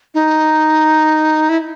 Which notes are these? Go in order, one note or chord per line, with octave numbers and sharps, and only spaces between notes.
D#4
E4